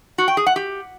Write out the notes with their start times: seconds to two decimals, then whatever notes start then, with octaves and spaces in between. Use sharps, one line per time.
0.18 F#4
0.28 G5
0.37 G#4
0.46 F#5
0.56 G4